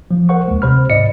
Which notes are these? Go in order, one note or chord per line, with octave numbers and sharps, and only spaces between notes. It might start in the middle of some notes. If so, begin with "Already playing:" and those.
F3
A#4 C5 F#5 C#6
D#2 G#3
C3 C5 B5 F6
G#2 D5 D#5 C#7